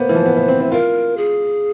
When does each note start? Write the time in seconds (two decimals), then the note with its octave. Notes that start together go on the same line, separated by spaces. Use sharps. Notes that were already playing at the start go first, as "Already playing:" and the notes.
Already playing: A#3 B3 C5
0.09 E3
0.15 F3
0.26 B3
0.37 B3
0.48 C4
0.60 E4
0.72 F4 A#4
1.17 G#4